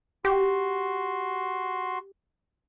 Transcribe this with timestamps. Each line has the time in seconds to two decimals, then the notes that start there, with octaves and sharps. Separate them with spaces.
0.25 F#4 G4 C6